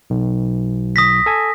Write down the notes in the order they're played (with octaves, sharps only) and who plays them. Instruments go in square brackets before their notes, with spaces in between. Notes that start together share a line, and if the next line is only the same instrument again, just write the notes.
[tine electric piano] B1
[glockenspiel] D#6 A#6 B6
[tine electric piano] A4 G#5